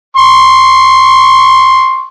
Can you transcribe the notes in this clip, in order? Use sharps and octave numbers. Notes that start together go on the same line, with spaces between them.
C6 C#6